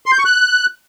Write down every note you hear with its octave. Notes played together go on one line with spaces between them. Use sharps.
C6
G6
C#6
F#6